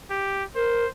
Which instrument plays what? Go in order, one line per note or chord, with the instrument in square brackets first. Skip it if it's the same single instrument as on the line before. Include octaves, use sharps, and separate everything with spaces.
[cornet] G4
[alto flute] A#4 [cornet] C5